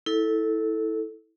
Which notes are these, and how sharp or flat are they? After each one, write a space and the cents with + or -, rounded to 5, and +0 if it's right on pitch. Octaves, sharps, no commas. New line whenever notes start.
E4 -20 A4 +0